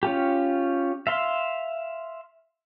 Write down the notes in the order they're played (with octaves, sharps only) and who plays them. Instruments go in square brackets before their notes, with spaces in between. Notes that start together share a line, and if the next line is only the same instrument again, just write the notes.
[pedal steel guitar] C#4 F4 G4
E5 F5 C6